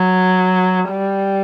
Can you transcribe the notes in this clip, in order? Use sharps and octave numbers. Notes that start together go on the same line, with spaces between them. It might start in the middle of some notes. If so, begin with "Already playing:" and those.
Already playing: F#3
G3